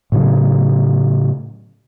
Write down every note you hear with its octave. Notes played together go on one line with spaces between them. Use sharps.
A2 C#3 F#3